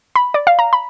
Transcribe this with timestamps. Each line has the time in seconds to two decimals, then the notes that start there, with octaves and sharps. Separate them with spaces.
0.16 B5
0.34 D5
0.47 F5
0.59 A#5
0.73 B5